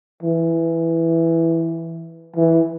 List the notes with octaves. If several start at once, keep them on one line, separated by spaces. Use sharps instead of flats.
E3
E3